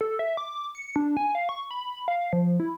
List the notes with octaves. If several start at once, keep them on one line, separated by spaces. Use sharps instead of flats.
A4
E5
D6
C#7
D4
G#5
F5
C#6
B5
F5
F3
E4